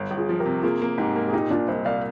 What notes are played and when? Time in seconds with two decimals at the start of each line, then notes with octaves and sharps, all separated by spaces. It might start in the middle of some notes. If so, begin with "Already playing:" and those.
Already playing: G1
0.11 G1
0.17 F4 G#4
0.29 F3
0.40 G4 A#4
0.46 C3
0.63 A#3 F4 G#4
0.82 A#3
0.98 G#2 D#4 G4
1.16 A#3
1.28 G#4
1.33 A#2 D#4 G4
1.50 A#2 D4 F4
1.68 C2 C5 D#5
1.85 C2 D5 F5